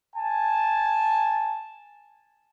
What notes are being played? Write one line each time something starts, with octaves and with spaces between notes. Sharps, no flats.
G#5 A5